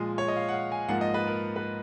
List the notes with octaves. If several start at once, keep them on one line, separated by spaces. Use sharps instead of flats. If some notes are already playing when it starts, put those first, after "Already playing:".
Already playing: A#2 F3 G#3 D#5
C#5
D#5
F5
F#5
F5
G#5
G#2 F3 A#3 F#5
D#5
B4
A#4
B4